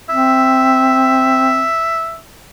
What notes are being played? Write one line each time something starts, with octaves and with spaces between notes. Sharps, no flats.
C4 E5